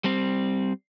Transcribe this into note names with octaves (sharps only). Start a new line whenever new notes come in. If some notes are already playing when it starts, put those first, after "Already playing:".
G3 C4